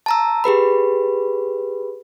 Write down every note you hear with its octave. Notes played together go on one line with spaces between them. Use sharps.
A5 A#5 E6
G4 G#4 B4 B5